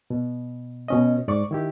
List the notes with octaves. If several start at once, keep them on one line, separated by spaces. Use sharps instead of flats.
B2
B2 C#4 D#5
G#2 D5 C#6 D6
D#3 E4 G4